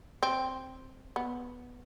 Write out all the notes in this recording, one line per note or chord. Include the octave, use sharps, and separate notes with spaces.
C4
B3